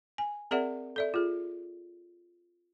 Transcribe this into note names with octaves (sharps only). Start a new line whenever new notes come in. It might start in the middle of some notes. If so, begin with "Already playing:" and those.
G#5
C4 G#4 A#4 D5 E5 F#5
A4 D5 E5
F4 G#4